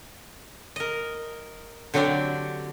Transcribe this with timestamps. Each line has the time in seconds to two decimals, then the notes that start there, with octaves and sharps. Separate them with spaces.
0.76 A#4 D#5
1.94 D3 F#3 C4 D4 G4 D5